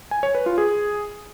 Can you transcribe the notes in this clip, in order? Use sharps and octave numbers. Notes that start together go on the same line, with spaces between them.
G#5
C#5
B4
F4
G#4